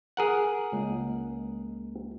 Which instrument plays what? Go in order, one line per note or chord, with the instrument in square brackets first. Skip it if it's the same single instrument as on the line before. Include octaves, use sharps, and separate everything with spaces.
[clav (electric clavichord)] G#4 A#4 F#5
[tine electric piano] C#2 G#3 A#3